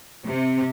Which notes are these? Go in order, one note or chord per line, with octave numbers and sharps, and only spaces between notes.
C3